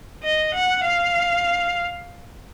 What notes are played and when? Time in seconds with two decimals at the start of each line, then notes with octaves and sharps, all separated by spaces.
0.23 D#5
0.54 F#5
0.83 F5